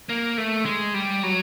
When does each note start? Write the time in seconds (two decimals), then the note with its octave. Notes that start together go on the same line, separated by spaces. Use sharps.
0.09 A#3
0.38 A3
0.65 G#3
0.94 G3
1.23 F#3